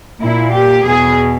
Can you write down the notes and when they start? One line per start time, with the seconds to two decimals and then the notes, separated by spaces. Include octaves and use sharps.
0.20 A#2 E4
0.53 G4
0.85 E2 B2 G#4